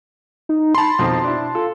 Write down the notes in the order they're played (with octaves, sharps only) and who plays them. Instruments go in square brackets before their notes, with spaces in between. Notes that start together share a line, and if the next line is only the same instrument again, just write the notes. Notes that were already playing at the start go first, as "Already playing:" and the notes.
[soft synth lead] D#4
[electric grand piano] A5 C6 [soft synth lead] B5
[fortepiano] F2 D#3 F3 [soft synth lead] B2
[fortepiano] D4 E4
[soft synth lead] F4 [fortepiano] A4